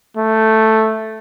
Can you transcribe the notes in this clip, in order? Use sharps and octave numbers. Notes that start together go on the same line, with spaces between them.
A3